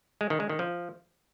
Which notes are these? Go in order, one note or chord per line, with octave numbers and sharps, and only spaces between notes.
G#3
D#3
G#3
D#3
F3